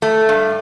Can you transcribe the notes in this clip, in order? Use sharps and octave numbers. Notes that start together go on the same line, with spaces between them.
A3
G2